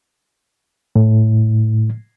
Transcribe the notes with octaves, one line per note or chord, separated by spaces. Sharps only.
A2